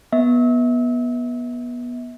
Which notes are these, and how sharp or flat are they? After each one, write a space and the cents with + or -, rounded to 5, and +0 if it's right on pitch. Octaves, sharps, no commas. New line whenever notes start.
B3 -20 E5 -35